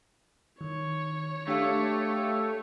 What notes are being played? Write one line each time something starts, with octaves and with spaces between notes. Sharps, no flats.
D#3 C#5
A3 D4 G4 F5 C#7